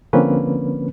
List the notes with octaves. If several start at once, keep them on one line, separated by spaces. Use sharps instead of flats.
D3 F3 A#3 C4 C#4 B4